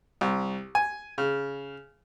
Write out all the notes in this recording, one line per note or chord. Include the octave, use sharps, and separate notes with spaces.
C2
G#5
C#3